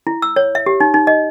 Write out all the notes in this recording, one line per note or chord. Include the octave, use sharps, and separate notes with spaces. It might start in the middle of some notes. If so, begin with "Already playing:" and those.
E4
E6
C#5
E5
G4
D#4
D#4
D#5